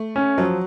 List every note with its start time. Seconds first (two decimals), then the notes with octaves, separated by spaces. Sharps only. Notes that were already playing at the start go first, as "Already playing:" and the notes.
Already playing: A3
0.16 C#4
0.38 F3 F#3